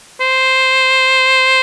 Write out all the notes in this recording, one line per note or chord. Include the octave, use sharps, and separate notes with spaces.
C5